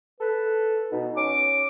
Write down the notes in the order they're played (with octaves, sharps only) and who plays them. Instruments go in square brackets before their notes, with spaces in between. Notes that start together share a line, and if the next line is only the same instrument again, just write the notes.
[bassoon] A4 [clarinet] B4
[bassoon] B2 [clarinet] D#4
[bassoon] C#4 [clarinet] D6